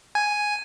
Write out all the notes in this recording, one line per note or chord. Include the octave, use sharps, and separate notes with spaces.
G#5